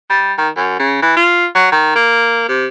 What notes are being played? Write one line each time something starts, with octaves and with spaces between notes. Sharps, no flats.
G3
D#3
F#2
C#3
E3
F4
F#3
D#3
A#3
C3